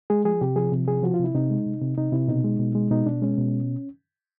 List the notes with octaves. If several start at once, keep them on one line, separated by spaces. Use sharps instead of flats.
G#3 G#4
F3 G#4
C3 G4
F3 G#4
C3
F3 G#4
F3 F#4
F4
C3 E4
C3 D#4
G#3
C3
C3
C3 D#4
C3 E4
B2 D#4
G#3
B2
G#3
B2 D#4
B2 D4
G#3 C#4
B2